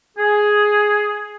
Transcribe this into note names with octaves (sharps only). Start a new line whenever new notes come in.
G#4